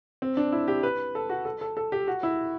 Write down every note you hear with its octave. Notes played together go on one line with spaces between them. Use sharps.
C4
D4
E4
G4
B4
A4
F#4
A4
A4
A4
G4
F#4
E4